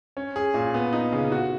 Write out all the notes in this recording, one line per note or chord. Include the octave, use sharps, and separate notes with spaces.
C#4
G#4
A#2
B3
D#4
C#3
F#4